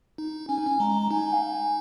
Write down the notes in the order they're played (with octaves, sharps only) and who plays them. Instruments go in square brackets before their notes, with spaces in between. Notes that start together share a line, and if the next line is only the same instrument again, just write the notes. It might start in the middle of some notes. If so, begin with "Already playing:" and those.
[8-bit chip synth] D#4
[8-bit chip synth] C#4 [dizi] G#5
[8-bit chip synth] D#4
C#4
[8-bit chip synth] G#3 [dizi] A#5
[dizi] A#5
[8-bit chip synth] D#4 [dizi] G#5
[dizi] F5
G#5